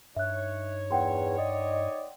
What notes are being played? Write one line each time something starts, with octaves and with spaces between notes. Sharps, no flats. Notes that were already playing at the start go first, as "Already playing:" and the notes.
G2 D#4 C#5 E5 F#6
E2 F#5 G5 C6
D5 D#5